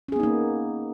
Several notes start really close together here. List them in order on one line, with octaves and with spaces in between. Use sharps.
C#4 G#4 B3 D#4 A#3